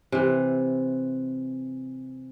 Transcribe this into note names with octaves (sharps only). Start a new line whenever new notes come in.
C3 E3